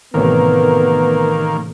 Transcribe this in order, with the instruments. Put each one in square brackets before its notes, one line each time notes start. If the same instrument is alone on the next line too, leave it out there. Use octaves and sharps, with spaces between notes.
[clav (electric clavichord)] A1 C3 C#5 [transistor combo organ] D#3 A#3 [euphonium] B3